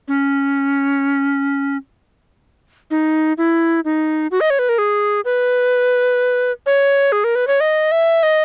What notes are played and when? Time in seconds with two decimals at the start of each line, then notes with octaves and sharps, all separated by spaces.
0.08 C#4
2.91 D#4
3.38 E4
3.85 D#4
4.31 F#4
4.41 D#5
4.50 C#5
4.59 B4
4.69 A#4
4.78 G#4
5.25 B4
6.66 C#5
7.12 G#4
7.24 A#4
7.35 B4
7.47 C#5
7.60 D#5
7.91 E5
8.23 D#5